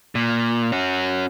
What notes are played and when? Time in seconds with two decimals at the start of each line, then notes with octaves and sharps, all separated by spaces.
0.15 A#2
0.72 C#4 F#4